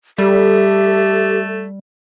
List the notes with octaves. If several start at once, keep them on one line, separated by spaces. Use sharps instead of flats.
G3 A3 G4 A4 E5